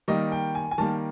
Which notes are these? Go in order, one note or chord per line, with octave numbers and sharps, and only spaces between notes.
D#3 G3 A#3 D#5
G5
G#5
G#5
D#3 G3 A#3 A5